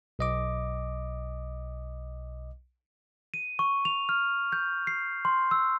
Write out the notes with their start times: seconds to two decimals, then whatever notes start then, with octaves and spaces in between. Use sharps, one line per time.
0.19 B1 D#5 D6
3.34 D#7
3.59 C#6
3.85 F7
4.09 F6
4.52 G6
4.87 C7
5.25 C6
5.51 E6